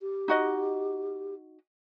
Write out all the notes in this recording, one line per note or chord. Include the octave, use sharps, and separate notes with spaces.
G4
D#4 F#4 D#5